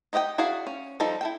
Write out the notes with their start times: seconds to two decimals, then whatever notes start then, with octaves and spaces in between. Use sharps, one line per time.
0.13 D#4 G4 D#5 F#5 G5
0.38 E4 F#4 G#4 D5 F5
0.67 C#4
1.00 F3 G3 D#4 A4 D5
1.21 E4 A4 G5